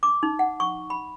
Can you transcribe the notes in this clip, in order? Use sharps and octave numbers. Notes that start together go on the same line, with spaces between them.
D6
D#4
F#5
C#6
B5